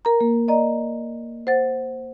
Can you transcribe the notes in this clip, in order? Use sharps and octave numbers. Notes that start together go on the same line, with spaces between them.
A#4 A#5
A#3
D5 D#5 A#5
C5 F#5 A6